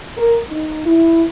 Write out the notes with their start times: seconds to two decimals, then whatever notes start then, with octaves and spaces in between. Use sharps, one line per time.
0.17 A#4
0.50 D#4
0.86 E4